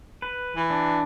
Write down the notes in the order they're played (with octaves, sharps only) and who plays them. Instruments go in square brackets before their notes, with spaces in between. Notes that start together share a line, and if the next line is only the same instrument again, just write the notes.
[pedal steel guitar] B4
[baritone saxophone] E3
[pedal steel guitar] D4